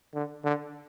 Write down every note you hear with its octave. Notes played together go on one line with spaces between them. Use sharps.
D3
D3